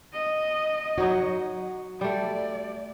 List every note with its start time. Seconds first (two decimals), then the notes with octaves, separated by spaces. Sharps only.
0.13 D#5
0.98 F#3 D#4 F#4 C#5
2.01 G3 A3 D5